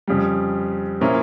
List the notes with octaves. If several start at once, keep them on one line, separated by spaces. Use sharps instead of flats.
F2 C#3 G3
A#2 F3 C#4 E4 A#4